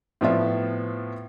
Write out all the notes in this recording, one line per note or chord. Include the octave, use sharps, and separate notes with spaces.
A2 F3 B3 F4 E5